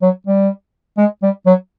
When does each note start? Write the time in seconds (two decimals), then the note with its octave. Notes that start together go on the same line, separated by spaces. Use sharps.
0.02 F#3
0.27 G3
0.98 G#3
1.22 G3
1.46 F#3